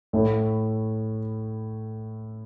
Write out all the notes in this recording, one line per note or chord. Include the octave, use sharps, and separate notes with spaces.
A2 A3 E4